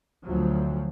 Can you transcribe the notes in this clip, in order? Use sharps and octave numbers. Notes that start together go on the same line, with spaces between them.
D2 F3 F#3